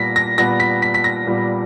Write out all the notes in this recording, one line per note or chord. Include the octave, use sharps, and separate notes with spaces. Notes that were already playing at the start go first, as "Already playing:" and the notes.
Already playing: A#2 G3 B3 A#6 B6
A#6
A#2 G3 B3 A#6
B6
B6
B6
A#6
A#2 G3 B3